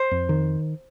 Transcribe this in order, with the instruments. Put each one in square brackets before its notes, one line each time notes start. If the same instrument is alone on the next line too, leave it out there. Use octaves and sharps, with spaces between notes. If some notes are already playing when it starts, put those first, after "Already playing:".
Already playing: [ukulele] C5
[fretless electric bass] F2
D#3